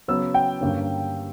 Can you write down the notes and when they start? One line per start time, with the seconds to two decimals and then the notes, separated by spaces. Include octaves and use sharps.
0.08 C#3 F#3 B3 E6
0.34 G5
0.61 G2 D3 A#3 C#4